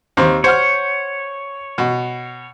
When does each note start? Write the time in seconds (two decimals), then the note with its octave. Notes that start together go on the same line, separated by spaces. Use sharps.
0.17 D#2 C4 C6
0.44 C5 C#5 F#5 F6
1.78 B2